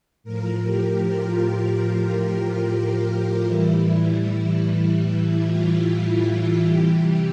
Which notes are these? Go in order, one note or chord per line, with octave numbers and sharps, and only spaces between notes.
A2 F3 A#4
G4
F4
F4
A2 E3 G3 E4
E4
F4
C3 E3 G3 G4